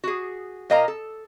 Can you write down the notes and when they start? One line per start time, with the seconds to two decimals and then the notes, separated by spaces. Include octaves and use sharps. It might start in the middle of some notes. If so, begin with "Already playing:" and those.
0.04 F#4 G#4
0.70 A#2 A#3 D#5 F5 A#5
0.88 A4